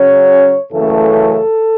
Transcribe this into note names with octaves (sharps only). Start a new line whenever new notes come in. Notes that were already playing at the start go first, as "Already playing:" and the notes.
Already playing: C#3 F#3 C#4 C#5
F#2 C#3 E3 A3 A4